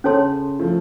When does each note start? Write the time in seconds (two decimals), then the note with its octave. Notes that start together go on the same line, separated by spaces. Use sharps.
0.04 C#3 C#4 A4 C#5 A5 C6
0.59 F3 A3